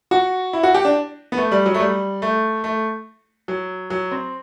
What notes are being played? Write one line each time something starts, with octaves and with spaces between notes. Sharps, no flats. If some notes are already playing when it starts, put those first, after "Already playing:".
F#4
E4
F#4
G4
D4
B3
A3
G3
F#3
A3
G3
A3
A3
F#3
F#3
C4